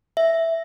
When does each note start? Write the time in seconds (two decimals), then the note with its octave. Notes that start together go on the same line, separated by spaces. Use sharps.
0.17 E5